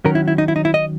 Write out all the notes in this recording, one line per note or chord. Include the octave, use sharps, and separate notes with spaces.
D#3 F#3 C#4 A#4
E4
E4
D#4
E4
D#4
E4
D#5